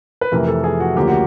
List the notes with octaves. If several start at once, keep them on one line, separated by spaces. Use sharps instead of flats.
B4
F2 C3 E3 A3 A#4
A4
G#4
F#4
D2 C#3 F3 A#3 G4
F#4